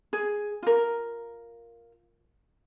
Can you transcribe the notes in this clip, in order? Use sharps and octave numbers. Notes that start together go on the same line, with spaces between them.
G#4
F4 A#4